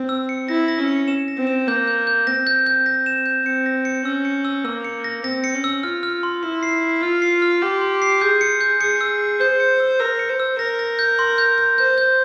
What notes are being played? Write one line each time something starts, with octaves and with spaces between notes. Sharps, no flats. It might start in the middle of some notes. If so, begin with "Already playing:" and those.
Already playing: C4
E6
C#7
E4 A#6
A#6
C#4
C#7
E7
A#6
C4
E7
A#3 G6
G6
G6
C4 A#6
G6
G6
A#6
E7
G6
C4 C#7
A#6
C#7
C#4 E6
C#7
E6
A#3 E6
C#7
A#6
C4 A#6
C#7
C#4
E6
F4 F6
F6
C6
E4 C6
C7
C7
F4 F6
C7
F6
G4 C6
C6
C7
G#4 G6
C#7
G6
G#4 C#7
E6
E6
C5 G6
C#7
E6
A#4 E6
C#7
C5
E6
A#4 A#6
A#6
G6
C6
G6
G6
C5 G6
G6